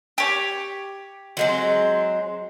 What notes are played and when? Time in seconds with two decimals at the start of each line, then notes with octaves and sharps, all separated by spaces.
0.18 G4 C#5
1.37 F#3 G#3 C4